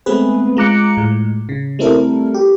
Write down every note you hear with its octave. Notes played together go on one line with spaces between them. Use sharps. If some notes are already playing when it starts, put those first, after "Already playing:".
G#3 A3 B3 C4 G#4 B4
G#3 F4 A#5 D6 F#6 C#7
A2 G#3
C#3
G3 A3 C4 E4 A4 A#4
G4